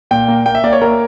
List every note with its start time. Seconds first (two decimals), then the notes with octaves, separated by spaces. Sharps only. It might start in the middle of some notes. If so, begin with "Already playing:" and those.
0.11 A#2 G5
0.28 A#3
0.46 A#3 G5
0.55 E5
0.64 A#3 D5
0.73 C#5
0.82 A#3 A#4